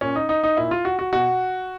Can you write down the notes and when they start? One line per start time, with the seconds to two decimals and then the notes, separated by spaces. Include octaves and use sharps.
0.01 A#2 C#4
0.16 D#4
0.29 D#4
0.43 D#4
0.57 A#2 E4
0.71 F4
0.85 F#4
0.99 F#4
1.12 B2 F#4